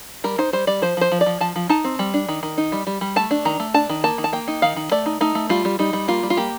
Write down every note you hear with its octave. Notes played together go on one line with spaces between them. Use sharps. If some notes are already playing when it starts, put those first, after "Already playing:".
G3 A#4
D#4 C5
G3 C5
G3 D5
F3 C5
F3 C5
F3
D5
F3
F3 A5
F3
D#4 A5
C4
G3
D4
D#3
D#3
D#4
G3
G3
G3
A3 A5
D4
D#3 A#5
A3
D4 A5
D#3
A#3 A5
D#3
A5
A#3 G5
D#4
D#3 F5
D#3
A3 D5
D#4
A3 D#4
A3
G3 F4
G3
G3 D#4
G3
A#3 F4
G3
F4
A#3 G4